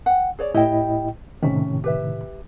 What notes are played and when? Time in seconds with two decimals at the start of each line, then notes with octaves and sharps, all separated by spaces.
0.06 F#5 G5
0.39 G#4 C#5 D5
0.54 A2 E4 G4 D#5 G5
1.43 A2 C3 D#3 C#4
1.84 G4 B4 E5